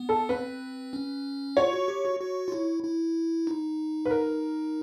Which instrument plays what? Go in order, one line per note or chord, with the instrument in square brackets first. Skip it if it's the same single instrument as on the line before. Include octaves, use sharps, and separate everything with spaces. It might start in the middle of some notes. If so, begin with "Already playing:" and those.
Already playing: [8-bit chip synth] B3
[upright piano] A4
[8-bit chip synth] C4 [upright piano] B4
[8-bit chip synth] C#4
[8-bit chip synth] F4 [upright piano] C#5
[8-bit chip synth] F#4
G4
F#4
F#4
F4
E4
E4
D#4
[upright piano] B4
A#4